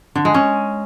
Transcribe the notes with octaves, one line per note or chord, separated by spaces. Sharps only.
D3
G#3
C#4